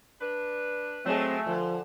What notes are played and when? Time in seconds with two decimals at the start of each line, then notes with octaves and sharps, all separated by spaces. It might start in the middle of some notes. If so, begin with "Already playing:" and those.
0.21 D4 B4
1.06 F#3 G#3 A3 C4 G#4
1.47 D3 F3